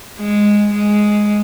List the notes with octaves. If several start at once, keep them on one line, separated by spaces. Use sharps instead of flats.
G#3
G#3